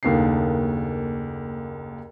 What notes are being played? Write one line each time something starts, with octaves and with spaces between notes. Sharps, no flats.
F#1 D#2 A3 D4 D#4 C7